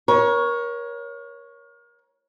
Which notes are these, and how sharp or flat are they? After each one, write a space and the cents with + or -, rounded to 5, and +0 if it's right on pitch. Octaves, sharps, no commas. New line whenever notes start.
A#4 +30 C#5 +0